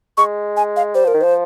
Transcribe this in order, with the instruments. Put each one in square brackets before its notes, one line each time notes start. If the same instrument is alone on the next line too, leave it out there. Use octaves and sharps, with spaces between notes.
[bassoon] G#3 [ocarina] C#6
[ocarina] G#5
F5
[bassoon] G3 [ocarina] C5
[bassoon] F3 [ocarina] A#4
[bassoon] D#3
[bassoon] F3 [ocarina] C5